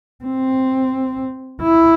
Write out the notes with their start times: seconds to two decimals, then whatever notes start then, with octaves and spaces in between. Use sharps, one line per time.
0.25 C4
1.62 E4